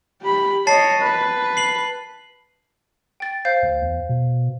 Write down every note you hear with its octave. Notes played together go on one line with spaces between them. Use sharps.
G4 B5
C#5 D#5 A5 A6 C7
B4
C7 F#7
G5 A6
C5 F5 G6
D2
E2
B2